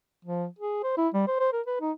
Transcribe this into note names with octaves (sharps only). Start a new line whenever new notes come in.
F3
G#4
C5
E4
G3
C5
C5
A#4
B4
D#4